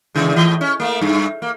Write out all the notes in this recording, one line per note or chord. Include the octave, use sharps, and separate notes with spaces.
E2 C#3 G#3
A2 E3 D#5
C#4
A3 A#3
G2
A#3